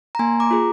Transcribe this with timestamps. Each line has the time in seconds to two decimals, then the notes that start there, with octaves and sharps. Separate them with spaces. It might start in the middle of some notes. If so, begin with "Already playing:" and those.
0.15 A#5
0.19 A#3 G#5 C6
0.40 A#5 D6
0.51 F4 G#4